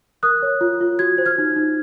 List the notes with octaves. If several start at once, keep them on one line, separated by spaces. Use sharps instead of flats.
A#4 D#6 F#6
C#5
F4
F4
F#4 G#6
C5
F6 G#6
D#4
D#4